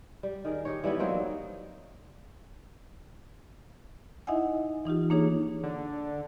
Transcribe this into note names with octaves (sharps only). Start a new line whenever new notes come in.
G3
D#3 G#4 A#4
D#4 G4 C#5
E3 G3 B3 E4
F#3 A#3 C4 D#4
D#4 E4 D#5 E5 F#5 G#5
E3 D#4 F4 G4
A#3 D4 D#4 G#4 C#5
D3 D4